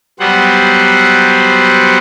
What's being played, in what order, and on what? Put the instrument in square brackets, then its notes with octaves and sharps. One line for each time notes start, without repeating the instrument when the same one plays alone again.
[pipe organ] F#3 G3 B3 C5 F#5